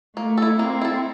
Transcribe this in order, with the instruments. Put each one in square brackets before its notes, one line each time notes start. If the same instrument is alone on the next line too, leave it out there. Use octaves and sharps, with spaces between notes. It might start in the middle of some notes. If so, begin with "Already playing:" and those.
[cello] A3 [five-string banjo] A#3
[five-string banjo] E4 A4
[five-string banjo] A#3 [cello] C4
[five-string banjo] E4 A4